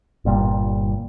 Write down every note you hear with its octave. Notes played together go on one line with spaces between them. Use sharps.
G1 A#2 G3